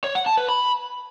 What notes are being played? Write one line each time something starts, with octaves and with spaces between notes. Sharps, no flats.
C#5
F#5
A5
B4
B5